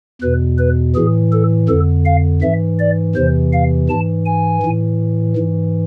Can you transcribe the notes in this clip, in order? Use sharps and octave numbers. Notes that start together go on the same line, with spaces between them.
E2 B2 B4
B4
A2 E3 G#4
A4
F2 D3 A4
F5
G#2 E3 E5
D5
E2 C3 E3 C5
F5
G#2 E3 A5
G#5
A2 E3
G#2 E3